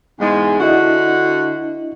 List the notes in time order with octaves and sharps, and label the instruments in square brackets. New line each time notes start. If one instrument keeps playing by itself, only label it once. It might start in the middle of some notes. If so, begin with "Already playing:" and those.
[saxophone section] E2 G#2 G#3
[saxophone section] D3 F#4 [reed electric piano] D4 E4 D#5